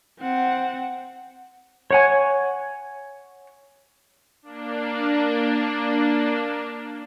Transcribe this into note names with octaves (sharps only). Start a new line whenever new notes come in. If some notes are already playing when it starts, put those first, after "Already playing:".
C4 F#5
C#5 F#5 G#5
A#3 D4